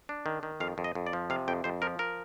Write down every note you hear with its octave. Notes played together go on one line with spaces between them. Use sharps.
D4
D#3
D#3
F2 F5
F2
D#5
F2
D5
F3
C3 F5
F2 G5
F2 C5
F3 A#4
A#4